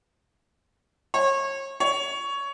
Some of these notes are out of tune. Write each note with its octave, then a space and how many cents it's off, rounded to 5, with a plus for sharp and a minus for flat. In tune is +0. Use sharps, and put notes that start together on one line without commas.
C#5 -30
C#5 +10